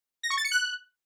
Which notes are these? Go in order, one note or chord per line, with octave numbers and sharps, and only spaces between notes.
A#6
C#6
A6
C#7
F#6